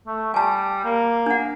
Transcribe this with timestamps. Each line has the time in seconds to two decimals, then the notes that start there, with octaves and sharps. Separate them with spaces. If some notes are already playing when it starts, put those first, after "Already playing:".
0.07 A3
0.34 G3 G#5 A5
0.84 A#3
1.26 D4 F#5